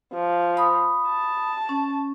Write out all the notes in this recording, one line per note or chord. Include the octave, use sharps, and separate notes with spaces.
F3
B5 D#6
A5
C#4